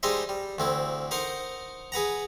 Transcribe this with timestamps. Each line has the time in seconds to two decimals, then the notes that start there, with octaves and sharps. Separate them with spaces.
0.03 G3 G#3 D#4 C5 D#5 E5
0.29 G3
0.58 D2 C4 E4
1.11 D#4 A#4 C5 F#5
1.92 G#4 B4 F#5 A#5